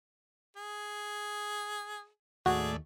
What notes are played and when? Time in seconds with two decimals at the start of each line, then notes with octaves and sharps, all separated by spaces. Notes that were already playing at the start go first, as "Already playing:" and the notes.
0.56 G#4
2.46 D#2 A2 A3 F#4 G#4 D5